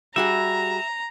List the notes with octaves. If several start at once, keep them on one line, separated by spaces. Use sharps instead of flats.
G3 F#4 G#4 E5 A#5